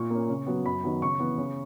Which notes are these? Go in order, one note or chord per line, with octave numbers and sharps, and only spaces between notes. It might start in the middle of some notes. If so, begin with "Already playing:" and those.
Already playing: A#2 C#6
A#3 C#4
C#3
F#3 B3
F#2 B5
D#3 F#3 B3
C#3 C#6
E3 B3
C#3